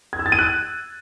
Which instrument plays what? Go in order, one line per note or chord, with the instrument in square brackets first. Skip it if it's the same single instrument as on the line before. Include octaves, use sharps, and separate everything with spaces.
[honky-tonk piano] G#6
E6
A6
D#7
F#6